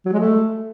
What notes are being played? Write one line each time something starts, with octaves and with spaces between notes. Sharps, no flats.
F#3
G#3
A3